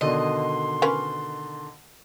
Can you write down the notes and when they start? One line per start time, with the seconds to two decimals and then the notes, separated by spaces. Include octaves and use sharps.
0.01 B2 D3 D#3 D#5 C6
0.82 C#4 A#4 B4